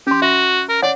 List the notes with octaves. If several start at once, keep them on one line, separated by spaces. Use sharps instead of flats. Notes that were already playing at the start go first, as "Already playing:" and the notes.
C#4 G4 C6
F#4 E5
A#4
C#5 D5 F#5